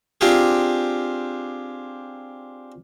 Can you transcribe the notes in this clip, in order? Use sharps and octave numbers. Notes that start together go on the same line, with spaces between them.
C4 D4 F4 G4 G#4